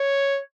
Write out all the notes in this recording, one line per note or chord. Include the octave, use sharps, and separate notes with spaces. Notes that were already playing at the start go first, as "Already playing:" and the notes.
Already playing: C#5